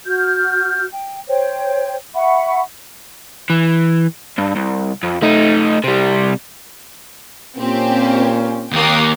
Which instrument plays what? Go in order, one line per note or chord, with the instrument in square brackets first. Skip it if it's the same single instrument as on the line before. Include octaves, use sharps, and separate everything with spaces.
[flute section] F#4 F6 G6
G5
C5 C#5 G5
E5 F#5 B5 C#6
[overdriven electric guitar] E3
G2
C2
F2
A3 D#4
C3 G3
[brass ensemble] A#2 C#4 [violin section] C4 G4 C5
[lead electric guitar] D#2 A#3 [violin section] G5 D#6